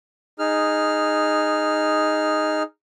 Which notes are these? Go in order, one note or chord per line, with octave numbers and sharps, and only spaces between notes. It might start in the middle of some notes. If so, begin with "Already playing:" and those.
D#4 G#4 F6